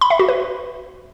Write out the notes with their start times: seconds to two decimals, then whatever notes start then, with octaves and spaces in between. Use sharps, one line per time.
0.01 B5
0.10 E5
0.19 F#4
0.28 B4